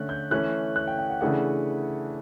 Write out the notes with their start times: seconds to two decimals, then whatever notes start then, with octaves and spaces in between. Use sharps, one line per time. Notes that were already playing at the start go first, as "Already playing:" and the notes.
Already playing: D3 A3 C#4 F#6
0.09 G6
0.31 E3 A3 C#4 F#6
0.76 F#6
0.88 G5
0.99 G5
1.10 F#5
1.21 C#3 E3 A3 D4 F#5